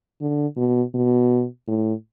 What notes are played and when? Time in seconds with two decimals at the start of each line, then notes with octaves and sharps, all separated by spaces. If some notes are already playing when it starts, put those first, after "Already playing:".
0.21 D3
0.57 B2
0.94 B2
1.68 A2